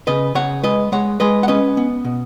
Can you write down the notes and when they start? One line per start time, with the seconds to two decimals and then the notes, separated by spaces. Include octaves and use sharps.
0.07 C#3 B4 D#5
0.35 C#3 C#5 F#5
0.63 G#3 B4 D#5
0.92 G#3 C#5 F#5
1.20 G#3 B4 D#5
1.43 F#5
1.48 C#4 B4 D#5
1.77 B3
2.05 B2